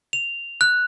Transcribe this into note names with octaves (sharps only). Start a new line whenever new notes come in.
F7
F#6